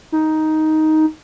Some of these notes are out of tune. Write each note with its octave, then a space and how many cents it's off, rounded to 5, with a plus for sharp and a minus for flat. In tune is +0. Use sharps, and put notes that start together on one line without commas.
D#4 +5